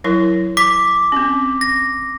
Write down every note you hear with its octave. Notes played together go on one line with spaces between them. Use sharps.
F#3 E4 A#4
D6 B6
C4 C#4
A#6